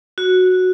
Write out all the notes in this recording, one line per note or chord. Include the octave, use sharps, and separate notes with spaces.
F#4